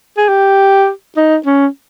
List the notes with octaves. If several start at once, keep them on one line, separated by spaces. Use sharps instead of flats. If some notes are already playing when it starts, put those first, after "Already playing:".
G#4
G4
D#4
C#4